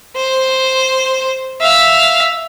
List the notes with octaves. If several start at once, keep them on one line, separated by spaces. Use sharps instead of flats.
C5
E5 F5